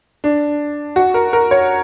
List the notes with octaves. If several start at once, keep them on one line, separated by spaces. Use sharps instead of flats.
D4
F#4
A#4
A#4
C#5